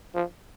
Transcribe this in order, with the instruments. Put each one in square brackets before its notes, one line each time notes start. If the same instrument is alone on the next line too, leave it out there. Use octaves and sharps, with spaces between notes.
[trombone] F3